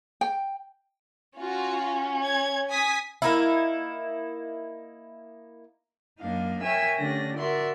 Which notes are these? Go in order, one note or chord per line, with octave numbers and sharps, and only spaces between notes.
G5
C#4 F4 F#4
C#5 G#6
G#5 D#6 B6
A#3 D#4 E4
F#2 A#3 D4 D#4 F5
A#4 C#5 E5 G5 G#5 E6
D3 A3 C#4 D4 G4 A#6
F#4 A#4 D5 E5 C6